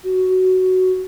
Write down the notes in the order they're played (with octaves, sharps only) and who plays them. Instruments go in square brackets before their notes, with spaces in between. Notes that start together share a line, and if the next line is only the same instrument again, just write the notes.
[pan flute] F#4